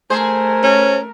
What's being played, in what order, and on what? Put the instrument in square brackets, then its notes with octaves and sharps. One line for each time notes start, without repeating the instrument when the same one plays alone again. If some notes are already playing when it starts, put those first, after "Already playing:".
[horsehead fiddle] A3 A#4 [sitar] G#4 C5
[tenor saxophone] C#4